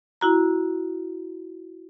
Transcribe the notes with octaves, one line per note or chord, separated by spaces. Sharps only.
E4 F#4 A#5